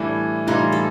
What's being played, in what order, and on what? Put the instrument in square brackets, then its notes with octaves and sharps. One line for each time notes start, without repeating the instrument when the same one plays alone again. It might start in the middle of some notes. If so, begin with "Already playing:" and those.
Already playing: [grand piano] A2 E3 G3 [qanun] D4 E4
[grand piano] A2 E3 G3 [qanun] D#4 F4
[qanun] A4